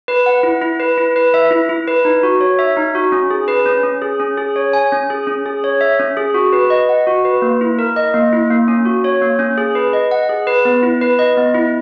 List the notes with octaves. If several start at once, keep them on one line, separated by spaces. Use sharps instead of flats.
B4
F#5
E4
E4
B4
E4
B4
E5
E4
E4
B4
D#4
F#4
C#5
E5
D#4
F#4
C#4
G#4
B4
C#4
C#4
G#4
C#4
G#4
C#5
G#5
C#4
G#4
C#4
G#4
C#5
E5
C#4
G#4
F#4
B4
D#5
F#5
F#4
B4
A#3
E4
A#4
D#5
A#3
E4
A#3
C#4
F#4
C#5
A#3
C#4
G#4
B4
D#5
F#5
G#4
B4
B3
E4
B4
D#5
B3
E4